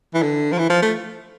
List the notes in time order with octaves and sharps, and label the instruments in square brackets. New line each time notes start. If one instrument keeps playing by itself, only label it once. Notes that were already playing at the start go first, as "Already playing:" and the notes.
[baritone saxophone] E3
D3
F3
E3
F3
A3